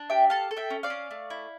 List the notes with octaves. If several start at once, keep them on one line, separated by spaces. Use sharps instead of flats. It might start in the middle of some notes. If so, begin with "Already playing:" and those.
Already playing: D4
G4 E5 G5
A4 F5 A5
A4
E5 G5
C#4
D5 F5
C#4
A3
E4